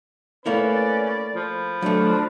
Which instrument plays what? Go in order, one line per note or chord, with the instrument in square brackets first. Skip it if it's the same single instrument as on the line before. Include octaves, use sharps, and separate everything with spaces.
[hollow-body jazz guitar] A3 A#3 E4 [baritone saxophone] C#4 [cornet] B4 [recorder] D5
[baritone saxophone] F3 [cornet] B5
[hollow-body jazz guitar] F#3 A3 [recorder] D4